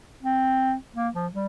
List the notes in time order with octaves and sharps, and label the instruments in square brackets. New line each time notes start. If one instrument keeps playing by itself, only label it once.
[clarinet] C4
A#3
F3
G3